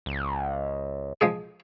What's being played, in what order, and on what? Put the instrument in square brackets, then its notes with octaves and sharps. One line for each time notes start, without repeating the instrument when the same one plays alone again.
[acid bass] C#2
[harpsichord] F3 G#3 G#4